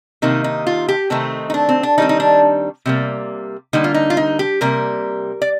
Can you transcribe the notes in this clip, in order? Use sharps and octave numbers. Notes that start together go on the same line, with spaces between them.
C3 D#3 A#3 D#4
D#4
F4
G4
C3 D#3 A3 C4 D#4
D#4
D4
C4
D4
D#3 G3 C4 D#4
D#4
D4
C3 G3 A#3
D3 G3 A#3 D#4
F4
D#4
F4
D#4
G4
C3 G3 A#3 A#4
D5